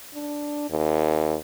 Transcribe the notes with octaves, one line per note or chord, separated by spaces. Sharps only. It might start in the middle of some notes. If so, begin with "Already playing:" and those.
D4
D#2